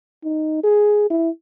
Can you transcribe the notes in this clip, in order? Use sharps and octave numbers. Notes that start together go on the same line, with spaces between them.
D#4
G#4
E4